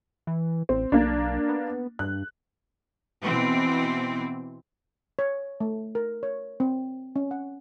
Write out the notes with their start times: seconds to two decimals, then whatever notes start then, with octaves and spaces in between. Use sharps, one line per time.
0.27 E3
0.69 A1 C4
0.92 B1 A#3 D4
1.49 B3
1.99 G2 F#6
3.22 B2 E3 C4
5.19 C#5
5.60 A3
5.95 A#4
6.23 C#5
6.60 C4
7.16 C#4
7.31 F#5